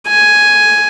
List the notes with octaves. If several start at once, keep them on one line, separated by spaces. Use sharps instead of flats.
G#5